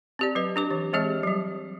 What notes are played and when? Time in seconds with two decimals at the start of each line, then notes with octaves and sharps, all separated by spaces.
0.19 C4 G4 D5
0.35 F#3 B4 D#5
0.56 D4 G4 D6
0.71 E3
0.93 E3 G#3 C4 G4 G#4 D#5
1.23 F#3 G3